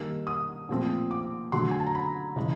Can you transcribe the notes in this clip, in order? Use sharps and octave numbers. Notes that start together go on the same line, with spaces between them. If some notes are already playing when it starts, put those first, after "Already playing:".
Already playing: D#3 G3 A#3 E6
D#6
A#2 F3 A3 C4
D6
D3 F#3 A3 C6
G#5
A5
A#5
B5
C#3 E3 G#3